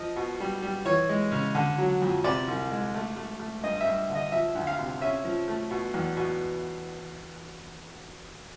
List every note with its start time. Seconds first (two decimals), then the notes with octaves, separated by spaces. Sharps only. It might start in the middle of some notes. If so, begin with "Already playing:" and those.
Already playing: F3 D#5
0.16 B2
0.40 G3
0.62 G3
0.85 E3 C#5
1.09 G#3
1.32 C#3
1.55 D3
1.78 F#3
2.02 F2
2.24 C3 D5
2.48 C2
2.71 G#3
2.94 A3
3.16 A3
3.39 A3
3.64 G2 D#5
3.81 G2 E5
4.09 D3
4.15 D#5
4.32 F3 E5
4.55 D2
4.67 F5
4.78 C3
5.01 C#4 E5
5.25 F3
5.48 A3
5.71 B2
5.94 E2
6.17 B2